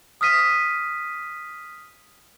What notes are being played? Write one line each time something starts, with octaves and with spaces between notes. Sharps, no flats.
D#6 F6 B6 D#7